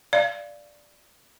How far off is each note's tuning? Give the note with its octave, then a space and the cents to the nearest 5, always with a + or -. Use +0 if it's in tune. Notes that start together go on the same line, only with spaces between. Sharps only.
D5 +0 F5 -20